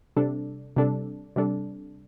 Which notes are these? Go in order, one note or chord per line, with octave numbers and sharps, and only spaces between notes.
C3 G3 D4 A4
C3 G3 D4 A4
C3 G3 D4 A4